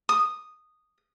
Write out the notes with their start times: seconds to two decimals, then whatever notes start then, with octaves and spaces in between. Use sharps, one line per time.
0.09 D#6